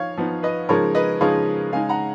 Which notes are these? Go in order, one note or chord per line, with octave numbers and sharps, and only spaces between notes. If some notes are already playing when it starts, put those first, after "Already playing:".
Already playing: F3 D#4 C#5 F5
F3 B3 D#4
B4 D#5
C#3 F3 G#3 D#4 A#4 C#5
B4 D#5
C#3 F3 G#3 D#4 C#5 F5
C#3 G#3 D#4 F5 G#5
F#5 A#5